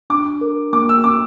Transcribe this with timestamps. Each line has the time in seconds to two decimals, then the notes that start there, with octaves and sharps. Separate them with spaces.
0.10 D4 D6
0.41 A#4
0.73 A#3 D6
0.89 E6
1.04 C#4 D6